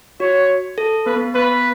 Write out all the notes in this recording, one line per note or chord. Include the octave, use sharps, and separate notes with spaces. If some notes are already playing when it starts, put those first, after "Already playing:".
F#4 C#5
A4
B3 B4
B3
B3 B4